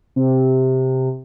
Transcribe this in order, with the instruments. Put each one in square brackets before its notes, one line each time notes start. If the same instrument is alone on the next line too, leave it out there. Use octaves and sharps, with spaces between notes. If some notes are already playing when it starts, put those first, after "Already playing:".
[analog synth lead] C3